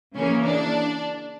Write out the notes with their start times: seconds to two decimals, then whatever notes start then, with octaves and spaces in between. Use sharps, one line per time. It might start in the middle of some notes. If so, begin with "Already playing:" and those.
0.15 C#3 E3 A#3 C#4
0.44 D4